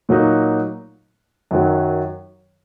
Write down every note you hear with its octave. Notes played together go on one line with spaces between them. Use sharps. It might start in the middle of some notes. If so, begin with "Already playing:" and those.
A#2 F#3 A#3 D#4 F#4
F#2 D#3 F#3